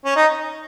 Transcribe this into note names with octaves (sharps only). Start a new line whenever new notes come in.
C#4
D#4